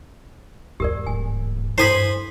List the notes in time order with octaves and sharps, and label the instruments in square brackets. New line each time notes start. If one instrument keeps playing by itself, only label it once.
[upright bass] E2 G#2 [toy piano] G4 A#4 D5
[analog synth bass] D1 [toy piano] G#5
[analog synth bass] G2 [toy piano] E4 A4 C6 [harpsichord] C5 G#5 B5